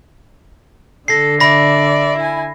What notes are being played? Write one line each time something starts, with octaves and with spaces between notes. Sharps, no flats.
D3 A4 A#6 C7
D5 E5 B5 A#6
E4 G#5